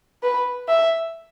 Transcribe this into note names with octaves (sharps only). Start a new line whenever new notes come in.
B4
E5